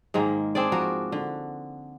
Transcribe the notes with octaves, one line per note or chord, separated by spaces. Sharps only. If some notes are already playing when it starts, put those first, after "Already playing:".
G#2 D#3 G#3 A#3
C4 D4 G#4 D5
F3 F#4 A#4
D3